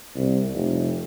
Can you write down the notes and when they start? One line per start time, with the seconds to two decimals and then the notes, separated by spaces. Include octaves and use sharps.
0.16 C2
0.53 F1